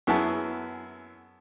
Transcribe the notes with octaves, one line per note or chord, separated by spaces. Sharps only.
F#2 B3 E4 G#4 A5